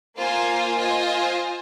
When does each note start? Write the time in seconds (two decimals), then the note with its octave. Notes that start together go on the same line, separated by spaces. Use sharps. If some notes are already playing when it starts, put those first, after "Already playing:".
0.17 A#3 F4 C5 F5 G#5
0.78 F4 C5 D#5 G#5